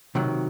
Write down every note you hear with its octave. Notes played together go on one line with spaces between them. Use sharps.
C3 D#3 F#3